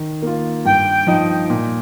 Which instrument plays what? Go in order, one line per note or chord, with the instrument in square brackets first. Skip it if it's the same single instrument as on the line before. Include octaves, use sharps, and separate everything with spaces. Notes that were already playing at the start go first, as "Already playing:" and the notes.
Already playing: [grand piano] D#3
A#3 F4
[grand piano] G2 [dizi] G5
[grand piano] F3 D#4
A#2